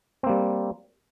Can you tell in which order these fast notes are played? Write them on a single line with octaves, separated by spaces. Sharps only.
C4 A#3 G3